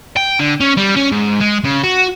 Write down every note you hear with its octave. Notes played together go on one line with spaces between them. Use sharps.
G5
D3
C#4
G3
C#4
G#2
G#3
C#3
F#4